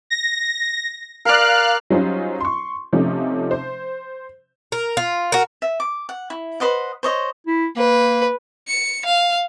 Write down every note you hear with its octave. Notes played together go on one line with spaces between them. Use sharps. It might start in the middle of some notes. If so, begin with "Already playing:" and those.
A#6
A#4 D5 F5 F6 F#6
F#3 G3 C#4 D#4 F4 C5
C6 C#6
C3 F3 A3 C#4 D#4
C5
A#4
F4
F#4 A#4
E5
D6
F#5
E4
B4 C5 D#5 F#5
C5 C#5 D#5
E4
A#3 B4
C#7
F5